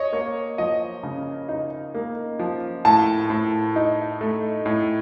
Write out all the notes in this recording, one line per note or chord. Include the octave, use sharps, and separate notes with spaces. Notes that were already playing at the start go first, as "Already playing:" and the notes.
Already playing: C#5 D#5
A#3 C#5
F3 D#5
C#3
D#4
A#3
F3
A2 A5
A2
D#4
A3
A2